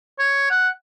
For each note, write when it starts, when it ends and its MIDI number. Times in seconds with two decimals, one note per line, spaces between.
0.19 0.50 73
0.51 0.69 78